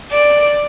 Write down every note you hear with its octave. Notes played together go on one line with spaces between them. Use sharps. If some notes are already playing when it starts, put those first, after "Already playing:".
D5